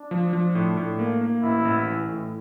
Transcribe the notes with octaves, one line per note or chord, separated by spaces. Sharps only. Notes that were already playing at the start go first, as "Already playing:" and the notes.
Already playing: D4
F3
F3
A2
A2
A#3
A#3
A1 E4
A1
E3
A2